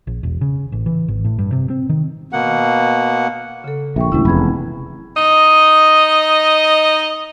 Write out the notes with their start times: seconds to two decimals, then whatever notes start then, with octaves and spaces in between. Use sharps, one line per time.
0.07 A#1
0.23 E1
0.41 C#3
0.72 A1
0.86 E3
1.08 G#1
1.25 A2
1.38 G2
1.52 C3
1.70 C4
1.89 D#3
2.33 B2 A#3 F#5
3.64 C#3 A4
3.96 A#1 E5 G5 C#6
4.12 E1 D2 G#3 C#4 E4
4.25 F1 E2 B5 G#6
5.17 D#4 D#5